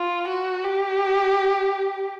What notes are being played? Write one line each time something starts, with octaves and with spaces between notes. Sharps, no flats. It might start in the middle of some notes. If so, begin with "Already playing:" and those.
Already playing: F4
F#4
G4